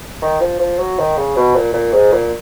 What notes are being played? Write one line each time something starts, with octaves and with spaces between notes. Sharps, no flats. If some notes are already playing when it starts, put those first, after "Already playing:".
D#3
F3
F3
F#3
D#3
C#3
B2
A#2
A#2
G#2
A#2